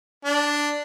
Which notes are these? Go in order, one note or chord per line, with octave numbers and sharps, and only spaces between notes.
D4